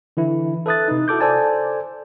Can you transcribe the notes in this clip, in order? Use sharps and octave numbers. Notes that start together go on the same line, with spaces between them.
D3 E3 E4
A4 B4 E5 D#6 F#6 A6
C3 D#4
E4 F#4 A4 D6 G6
A4 C5 D5 G#5 A5